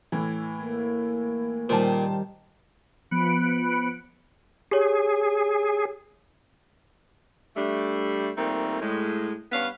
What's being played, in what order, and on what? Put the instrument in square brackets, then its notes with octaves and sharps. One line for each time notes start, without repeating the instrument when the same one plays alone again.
[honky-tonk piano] A2 E3
[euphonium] A#3
[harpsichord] A#2 [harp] D#3 G3 [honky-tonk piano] C5 A5
[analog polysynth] F3 B3 B5 F#6 C#7 D7
[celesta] G4 C#5 [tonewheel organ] G#4
[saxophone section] G3 A3 D4
A#2 D#3 G3 A3 A#3 C4
A2 G#3
G2 B3 C#4 F5